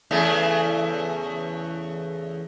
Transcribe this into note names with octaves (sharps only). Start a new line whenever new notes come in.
E2 C#3 A3